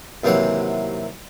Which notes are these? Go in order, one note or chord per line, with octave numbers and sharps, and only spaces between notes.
D#2 C3 E3 F#3 F#5